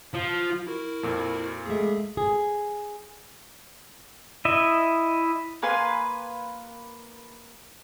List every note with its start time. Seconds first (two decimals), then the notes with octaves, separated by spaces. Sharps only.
0.14 F3
0.67 E4 F#4 A#4
1.03 F2 A#2
1.66 G#3 A3 G#4 E5
2.17 G#4
4.45 E4 D#5 E5
5.62 A#3 B4 G#5 C6